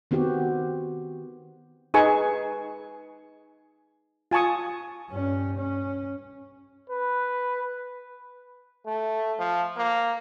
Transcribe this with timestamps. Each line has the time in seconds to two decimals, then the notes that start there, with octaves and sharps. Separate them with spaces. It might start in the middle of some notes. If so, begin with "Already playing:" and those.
0.11 D#3 B3 C4 F#4 G4
1.94 D#4 G#4 B4 G#5 C#6
4.31 F4 G#5 A5 C#6 D#6
5.10 G2 C#4
5.57 C#4
6.90 B4
8.86 A3
9.39 F3
9.77 A#3